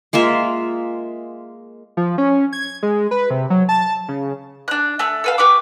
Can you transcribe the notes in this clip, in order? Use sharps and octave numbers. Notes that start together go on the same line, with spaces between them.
G#3 A#3 F4 E5
F3
C#4
G#6
G#3
B4
C3
F#3
A5
C#3
D4 F#6
A3 E6 F#6
A4 B4 F5
G4 B4 C#6 D6